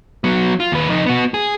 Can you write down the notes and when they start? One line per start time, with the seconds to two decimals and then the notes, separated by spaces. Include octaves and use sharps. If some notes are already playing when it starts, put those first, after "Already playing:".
0.24 F#3 B3
0.60 F4
0.72 D#2 B4
0.89 F2 D#4
1.06 B3 F#4
1.34 G#4